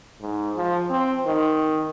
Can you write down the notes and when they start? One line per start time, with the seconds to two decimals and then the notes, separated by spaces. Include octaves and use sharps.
0.21 G#2
0.56 F3
0.90 C4
1.26 D#3